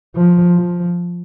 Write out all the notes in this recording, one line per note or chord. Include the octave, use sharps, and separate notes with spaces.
F3
F3